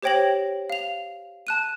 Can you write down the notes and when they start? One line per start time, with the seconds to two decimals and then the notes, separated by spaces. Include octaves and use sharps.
0.03 G4 C5 C#5 G5 A#6 F#7
0.70 F5 F7
1.47 A5 F#6 D#7